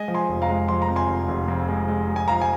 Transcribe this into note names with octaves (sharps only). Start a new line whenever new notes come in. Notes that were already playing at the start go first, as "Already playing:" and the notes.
Already playing: G#3 D#5 G#5
F3
G#5 C6
F1
F5 A#5
G#3
F3 C6
A#5
F2
G#5 C6
F1
F1
F2
G#3
G#3
G#3
G#5
F3 F5 A#5
G#5